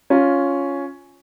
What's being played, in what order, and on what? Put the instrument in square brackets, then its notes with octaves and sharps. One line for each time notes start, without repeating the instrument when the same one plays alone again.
[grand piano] C#4 F4